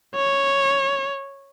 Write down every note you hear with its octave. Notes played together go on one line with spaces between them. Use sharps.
C#5